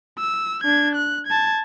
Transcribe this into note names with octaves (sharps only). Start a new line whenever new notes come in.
E6
D4 G#6
F#6
A5 G#6